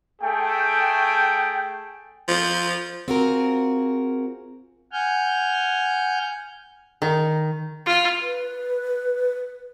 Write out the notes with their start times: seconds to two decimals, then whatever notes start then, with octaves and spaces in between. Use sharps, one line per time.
0.22 A3 G#4 G5
2.28 F3
3.08 C4 F4 F#4 G#4 A#4
4.92 F#5 G#5 F6 G6
7.02 D#3
7.86 F4
8.21 B4